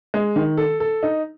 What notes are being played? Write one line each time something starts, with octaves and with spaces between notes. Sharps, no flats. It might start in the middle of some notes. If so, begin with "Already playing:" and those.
G#3
D#3
A4
A4
D#4